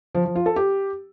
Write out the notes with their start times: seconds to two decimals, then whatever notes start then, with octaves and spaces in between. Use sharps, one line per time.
0.15 F3
0.25 F3
0.35 F4
0.46 A4
0.56 G4